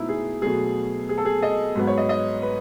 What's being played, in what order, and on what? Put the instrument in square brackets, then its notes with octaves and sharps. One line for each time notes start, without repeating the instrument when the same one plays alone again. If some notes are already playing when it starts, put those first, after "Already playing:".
Already playing: [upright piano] B2 A3 D#4 E4
G#4
B2 F#3 A3 G#4
G#4
A4
G#4
D#5
G#2 F#3 B3
C#5
D#5
D#5
B4